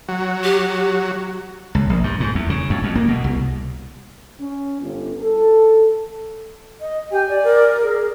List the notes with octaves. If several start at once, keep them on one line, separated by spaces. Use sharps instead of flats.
F#3
G4
C#2
A#1
G2
G#2
E2
C#3
F2
F2
A#3
B2
C2
C#4
G1
A4
D#5
G4 G#5
D5
A#4
G#4